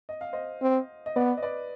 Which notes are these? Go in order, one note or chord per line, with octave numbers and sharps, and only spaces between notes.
D#5
F5
C5 D#5
C4
D#5
B3 B4 D5
D#5
B4 D5